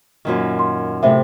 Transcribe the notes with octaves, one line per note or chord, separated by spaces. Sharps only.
F#2 A#2 D#3
C6
A2 C3 E5